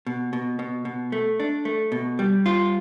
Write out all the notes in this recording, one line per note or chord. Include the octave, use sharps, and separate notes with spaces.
B2
B2
B2
B2
A3
D4
A3
B2
G3
F4